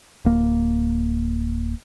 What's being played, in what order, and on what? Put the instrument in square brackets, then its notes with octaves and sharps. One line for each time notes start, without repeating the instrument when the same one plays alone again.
[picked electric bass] D1 A#3